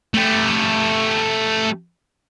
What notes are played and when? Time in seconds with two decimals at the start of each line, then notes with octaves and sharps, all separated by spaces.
0.14 A3 G4